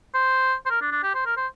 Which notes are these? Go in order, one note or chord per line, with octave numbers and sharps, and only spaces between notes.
C5
C5
A#4
D4
D4
G4
C5
A#4
C5